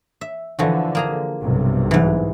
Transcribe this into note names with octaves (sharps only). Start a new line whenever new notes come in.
E5
D3 E3 F3 F#4
A#3 G#4 A#5
B1 G2 C3
G#2 E3